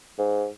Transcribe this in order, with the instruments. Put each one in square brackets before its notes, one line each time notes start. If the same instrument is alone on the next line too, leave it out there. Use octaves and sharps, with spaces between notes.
[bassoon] G#2